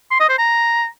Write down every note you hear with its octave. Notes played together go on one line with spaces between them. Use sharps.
C6
D#5
C5
A#5